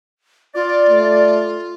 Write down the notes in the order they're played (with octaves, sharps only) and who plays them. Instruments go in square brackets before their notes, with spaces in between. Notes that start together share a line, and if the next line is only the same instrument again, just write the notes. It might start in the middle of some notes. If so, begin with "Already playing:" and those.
[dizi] F4 [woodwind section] D5
[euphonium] A3